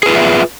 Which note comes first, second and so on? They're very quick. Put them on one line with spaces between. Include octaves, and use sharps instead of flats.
G#4 B4 E4 F4 E5